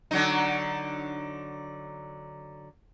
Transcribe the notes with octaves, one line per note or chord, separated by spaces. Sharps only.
D3 F#3 D#4